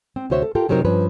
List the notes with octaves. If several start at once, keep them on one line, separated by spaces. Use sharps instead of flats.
C4
D2 C3 F#4 C5 C#5 E5
A4
F4 G4 A4 A#4 G5
F#2 C3 F#3 C4 D#4 A#4
G2 F3 C#4 B4